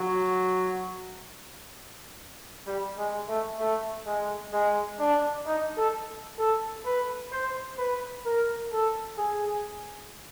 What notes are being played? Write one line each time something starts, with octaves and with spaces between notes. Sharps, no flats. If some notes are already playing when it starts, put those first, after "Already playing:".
Already playing: F#3
G3
G#3
A3
A3
G#3
G#3
D4
D#4
A4
A4
B4
C5
B4
A#4
A4
G#4